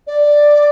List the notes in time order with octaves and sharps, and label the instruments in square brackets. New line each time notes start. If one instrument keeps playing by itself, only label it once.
[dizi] D5